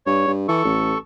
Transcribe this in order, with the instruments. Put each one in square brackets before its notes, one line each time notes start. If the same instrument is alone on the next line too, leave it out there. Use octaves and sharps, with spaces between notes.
[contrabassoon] G2 [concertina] C#5
[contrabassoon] G2
[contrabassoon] E3 [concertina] A4 C#6
[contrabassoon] A1